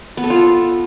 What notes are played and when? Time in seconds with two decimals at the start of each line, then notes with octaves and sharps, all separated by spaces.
0.17 B3
0.24 A4
0.30 F4